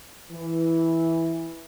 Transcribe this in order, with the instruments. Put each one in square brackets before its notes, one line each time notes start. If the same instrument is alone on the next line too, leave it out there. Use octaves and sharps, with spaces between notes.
[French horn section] E3